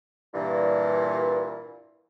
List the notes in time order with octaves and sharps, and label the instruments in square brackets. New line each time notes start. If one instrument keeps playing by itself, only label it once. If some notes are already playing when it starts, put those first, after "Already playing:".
[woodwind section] G2 A#2 E3